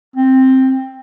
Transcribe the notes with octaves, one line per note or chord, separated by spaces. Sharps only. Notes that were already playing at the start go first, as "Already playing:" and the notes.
C4